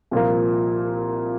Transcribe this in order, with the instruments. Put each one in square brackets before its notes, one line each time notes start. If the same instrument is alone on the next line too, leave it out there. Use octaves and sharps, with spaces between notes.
[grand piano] C2 A#2 F3 A#3 [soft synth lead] F4